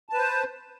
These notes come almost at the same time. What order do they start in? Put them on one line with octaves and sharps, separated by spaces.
A5 B4 C5